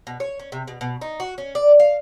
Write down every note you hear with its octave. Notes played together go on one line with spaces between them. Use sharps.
B2
C#5
C#4
C3
B2
B2
D#4
F#4
C#4
D5
F5